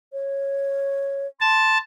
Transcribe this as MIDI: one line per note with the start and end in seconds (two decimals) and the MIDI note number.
0.13 1.27 73
1.41 1.78 81
1.41 1.78 84